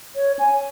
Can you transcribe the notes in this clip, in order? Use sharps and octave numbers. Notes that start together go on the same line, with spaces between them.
C#5
G#5